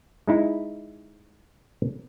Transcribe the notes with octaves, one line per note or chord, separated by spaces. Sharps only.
G#3 D#4 E4